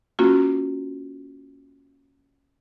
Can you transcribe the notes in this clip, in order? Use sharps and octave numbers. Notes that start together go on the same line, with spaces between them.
A#3 C#4 F4 F#4